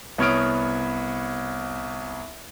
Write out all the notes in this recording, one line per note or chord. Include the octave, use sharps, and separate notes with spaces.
C2 B3 C#5 D#6 F6 D7